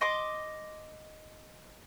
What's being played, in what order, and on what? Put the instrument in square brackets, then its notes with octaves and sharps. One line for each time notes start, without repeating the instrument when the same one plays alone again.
[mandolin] D#5 C6 D6